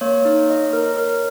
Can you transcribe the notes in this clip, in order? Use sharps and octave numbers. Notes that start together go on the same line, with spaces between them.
A#3 C#5
D#4
D#5
A#4
A#4